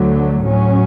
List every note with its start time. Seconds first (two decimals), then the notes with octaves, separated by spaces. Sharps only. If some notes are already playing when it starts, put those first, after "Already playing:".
Already playing: D2 D3 F#3 A3
0.43 A2 F#3 C#4